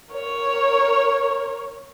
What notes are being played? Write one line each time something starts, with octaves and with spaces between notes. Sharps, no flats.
A#4 C#5